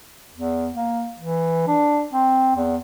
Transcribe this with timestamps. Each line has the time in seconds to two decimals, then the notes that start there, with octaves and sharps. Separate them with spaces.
0.34 E2
0.75 A#3
1.19 E3
1.68 D4
2.13 C4
2.56 E2